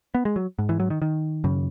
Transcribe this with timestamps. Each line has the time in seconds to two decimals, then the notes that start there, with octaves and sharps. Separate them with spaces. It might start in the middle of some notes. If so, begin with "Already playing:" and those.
0.15 B3
0.25 G#3
0.36 F#3
0.59 G#2
0.69 E3
0.80 F#3
0.90 D#3
1.02 D#3
1.44 F#2 C#3